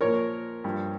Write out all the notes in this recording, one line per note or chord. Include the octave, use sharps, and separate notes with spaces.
A#2 F3 A#4 C#5
G2 F3